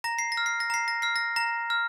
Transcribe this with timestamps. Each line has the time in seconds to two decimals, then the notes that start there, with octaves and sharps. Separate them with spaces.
0.04 A#5 A#6
0.19 C7
0.32 A#6
0.37 F6
0.46 C7
0.60 A#6
0.70 A#5 C7
0.88 A#6
1.02 F6 C7
1.16 A#6
1.36 A#5 A#6
1.70 F6